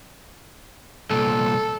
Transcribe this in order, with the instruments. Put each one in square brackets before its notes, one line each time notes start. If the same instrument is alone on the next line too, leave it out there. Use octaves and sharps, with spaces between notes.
[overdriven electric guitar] C2 A#2 [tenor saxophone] A4